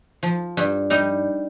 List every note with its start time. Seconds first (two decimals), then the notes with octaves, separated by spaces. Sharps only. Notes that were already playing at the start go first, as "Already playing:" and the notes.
0.23 F3
0.57 G2
0.90 G3 D#4